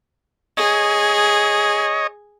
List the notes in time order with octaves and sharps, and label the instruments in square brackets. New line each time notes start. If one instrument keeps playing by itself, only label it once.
[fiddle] G#4 [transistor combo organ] C#5 D#5